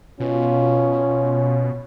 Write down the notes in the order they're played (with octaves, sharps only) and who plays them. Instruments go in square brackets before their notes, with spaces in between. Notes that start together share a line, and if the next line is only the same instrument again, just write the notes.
[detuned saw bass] B2 [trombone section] C#4 F4